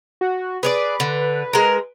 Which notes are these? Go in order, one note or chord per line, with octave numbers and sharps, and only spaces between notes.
F#4
G#4 B4 C#5 D5
D3
G#3 A#4